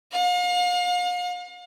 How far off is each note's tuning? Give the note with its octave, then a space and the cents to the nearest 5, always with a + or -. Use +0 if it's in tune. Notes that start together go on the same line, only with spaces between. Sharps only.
F5 +40